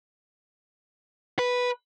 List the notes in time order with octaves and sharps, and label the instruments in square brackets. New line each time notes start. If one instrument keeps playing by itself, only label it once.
[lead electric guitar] B4